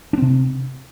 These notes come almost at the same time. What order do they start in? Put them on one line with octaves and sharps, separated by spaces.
D4 C4 C3